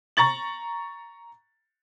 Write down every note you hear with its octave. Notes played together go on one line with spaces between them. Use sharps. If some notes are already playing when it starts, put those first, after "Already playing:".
A#5 C#6 A6 F#7